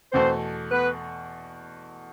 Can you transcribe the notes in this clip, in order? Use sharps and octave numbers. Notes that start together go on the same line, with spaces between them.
E2 B2 A3 C4 C5
B3 B4